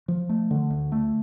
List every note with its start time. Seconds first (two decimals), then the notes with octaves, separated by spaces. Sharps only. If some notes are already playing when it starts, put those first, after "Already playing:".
0.08 F3
0.29 A3
0.51 D3
0.70 D2
0.92 A3